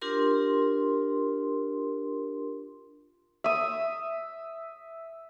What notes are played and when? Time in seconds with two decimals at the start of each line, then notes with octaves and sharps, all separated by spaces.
0.02 D4 F4 G4 A#4 C6
3.44 E5 D#6